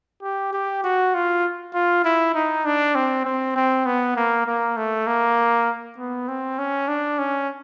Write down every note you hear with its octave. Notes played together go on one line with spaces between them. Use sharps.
G4
G4
F#4
F4
F4
E4
D#4
D4
C4
C4
C4
B3
A#3
A#3
A3
A#3
B3
C4
C#4
D4
C#4